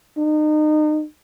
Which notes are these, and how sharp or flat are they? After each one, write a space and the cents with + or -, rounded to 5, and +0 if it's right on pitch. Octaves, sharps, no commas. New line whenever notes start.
D#4 -35